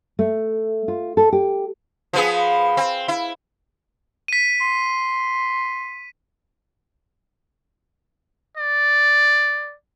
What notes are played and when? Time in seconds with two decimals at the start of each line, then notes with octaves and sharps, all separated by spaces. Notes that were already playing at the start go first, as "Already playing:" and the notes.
0.19 A3
0.88 F4
1.17 A4
1.32 G4
2.13 F3 B3 G#4
2.77 C4
3.08 E4
4.28 B6 D#7
4.61 C6
8.57 D5